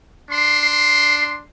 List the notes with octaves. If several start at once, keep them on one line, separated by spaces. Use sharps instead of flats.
D4 C6